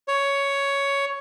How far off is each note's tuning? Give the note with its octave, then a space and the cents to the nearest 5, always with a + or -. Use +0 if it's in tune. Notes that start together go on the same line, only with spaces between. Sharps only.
C#5 +10